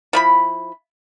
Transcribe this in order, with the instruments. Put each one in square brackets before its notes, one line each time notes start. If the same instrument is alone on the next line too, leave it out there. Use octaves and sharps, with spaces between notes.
[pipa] F3 E4 B5